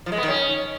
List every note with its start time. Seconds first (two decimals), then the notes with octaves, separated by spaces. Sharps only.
0.06 F3
0.12 G#3
0.17 B3
0.23 D#3
0.28 C#4